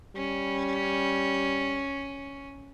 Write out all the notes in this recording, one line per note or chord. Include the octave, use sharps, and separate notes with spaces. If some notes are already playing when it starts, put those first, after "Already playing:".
G3 C#4